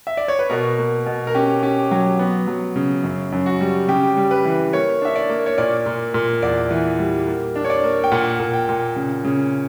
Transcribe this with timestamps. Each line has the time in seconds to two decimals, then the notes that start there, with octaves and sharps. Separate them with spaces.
0.07 E5
0.17 D5
0.28 C#5
0.39 B4
0.50 B2 A#4
0.78 A#3
1.06 B2
1.27 A#4
1.35 C#4 G4
1.63 C#4 G4
1.91 F#3 G4
2.19 B3
2.47 F#3
2.76 C#3
3.04 F#2
3.32 F#2
3.46 F#4
3.60 G3
3.88 C#3 G4
4.17 G3
4.31 B4
4.45 E3
4.73 A#3 C#5
5.01 D4 E5
5.15 D5
5.29 A#3
5.46 C#5
5.58 A#2 D5
5.86 A#2
6.14 A#2
6.42 E2 D5
6.71 E3
6.99 G3
7.27 A#3
7.56 D4
7.64 C#5
7.70 D5
7.84 A#3
8.04 G5
8.12 A#2 F#5
8.40 A#2
8.54 G5
8.69 A#2
8.96 C#3
9.25 C#3